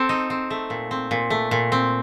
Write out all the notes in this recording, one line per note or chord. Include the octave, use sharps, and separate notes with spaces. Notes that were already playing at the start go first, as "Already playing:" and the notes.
Already playing: C4 A4
D#4
C4
A3
A#2
C4
A#2
A3
A#2
C4